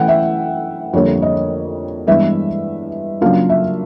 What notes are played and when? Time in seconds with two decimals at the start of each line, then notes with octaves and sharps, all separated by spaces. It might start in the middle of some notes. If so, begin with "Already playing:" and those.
Already playing: E3 A3 C#4 E4 F#5 G5
0.08 E5
0.93 F2 D3 G3 A#3 C#5
1.22 D#5
2.07 G2 E3 G#3 B3 E4 E5
3.21 C#3 F#3 A#3 D4 F4 F5
3.49 E5